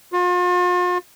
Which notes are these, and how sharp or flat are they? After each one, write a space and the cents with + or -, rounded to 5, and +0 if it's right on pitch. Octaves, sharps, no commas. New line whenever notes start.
F4 +40